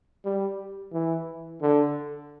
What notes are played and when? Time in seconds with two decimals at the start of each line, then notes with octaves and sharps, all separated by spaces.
0.25 G3
0.93 E3
1.61 D3